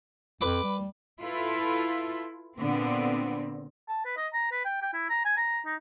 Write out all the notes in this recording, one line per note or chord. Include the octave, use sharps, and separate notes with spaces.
F2 B4 B5 D6
G3
E4 F4 A4 B4
A#2 D3 B3 C4
A5
B4
D#5
A#5
B4
G5
G5
E4
A#5
G#5
A#5
D#4